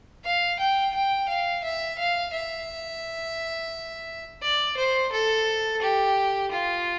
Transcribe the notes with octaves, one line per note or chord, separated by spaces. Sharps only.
F5
G5
G5
F5
E5
F5
E5
D5
C5
A4
G4
F4